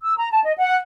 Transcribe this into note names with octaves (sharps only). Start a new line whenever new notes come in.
E6
A#5
A5
D#5
F#5